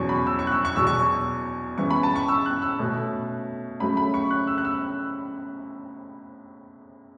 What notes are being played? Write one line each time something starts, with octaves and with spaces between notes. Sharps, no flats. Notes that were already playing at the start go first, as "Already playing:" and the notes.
Already playing: E2 B2 F#3 C#4 C#6
B5
E6
C#6
F#6
E6
C#6
E2 B2 F#3 E6
C#6
C#3 E3 B3 C#6
B5
A5
C#6
E6
F#6
E6
B2 A3 C#4
C#3 F#3 A3 C#4 B5
B5
C#6
F#6
E6
F#6
E6